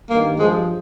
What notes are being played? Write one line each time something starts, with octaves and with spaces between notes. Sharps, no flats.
G2 D#3 A#3
G2 F3 G#3